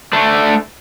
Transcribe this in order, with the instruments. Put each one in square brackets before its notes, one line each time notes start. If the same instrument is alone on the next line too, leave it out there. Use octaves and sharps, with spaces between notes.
[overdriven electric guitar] A3 D4